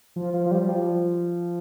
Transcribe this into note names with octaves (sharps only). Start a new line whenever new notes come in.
F3
F3
F3
G3
F3